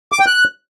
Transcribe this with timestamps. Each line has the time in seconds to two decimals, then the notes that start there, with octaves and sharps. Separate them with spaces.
0.12 D6
0.20 G5
0.27 F#6